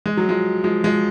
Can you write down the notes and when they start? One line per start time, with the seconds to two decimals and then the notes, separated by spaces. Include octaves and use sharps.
0.06 G#3
0.17 F#3
0.29 F3 G#3
0.64 F3 G#3
0.84 F3 G#3